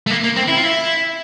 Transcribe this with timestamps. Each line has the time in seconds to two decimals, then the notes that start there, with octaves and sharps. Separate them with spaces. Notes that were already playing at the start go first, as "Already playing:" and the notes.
0.07 A3
0.10 A#3
0.24 A#3
0.37 C4
0.48 E4
0.57 F4
0.65 E4